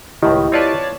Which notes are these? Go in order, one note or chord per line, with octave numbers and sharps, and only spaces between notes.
C#2 A2 D#3 E4 G4 D#5
C4 F4 B4 C#5 D5 A5